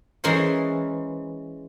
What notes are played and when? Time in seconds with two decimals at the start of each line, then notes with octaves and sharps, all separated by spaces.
0.24 E3 G#3 C#4 A#4 C5